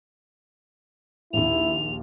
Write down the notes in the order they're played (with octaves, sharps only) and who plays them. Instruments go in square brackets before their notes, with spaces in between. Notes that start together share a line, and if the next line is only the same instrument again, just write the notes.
[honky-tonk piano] A#1 D#2 [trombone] E4 [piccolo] F7